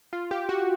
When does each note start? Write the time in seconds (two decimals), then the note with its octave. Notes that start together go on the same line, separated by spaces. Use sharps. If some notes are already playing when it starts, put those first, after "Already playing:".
0.13 F4
0.31 G4
0.49 F#4